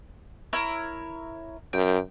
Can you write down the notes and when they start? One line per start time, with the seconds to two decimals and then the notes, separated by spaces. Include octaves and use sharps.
0.53 E4 A#4 C#5
1.73 F#2 G5